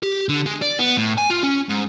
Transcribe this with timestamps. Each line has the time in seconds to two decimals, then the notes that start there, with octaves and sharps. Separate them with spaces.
0.03 G4
0.29 D3
0.46 G#3
0.62 D5
0.79 B3
0.97 A2
1.18 G#5
1.30 F4
1.44 C#4
1.69 G#2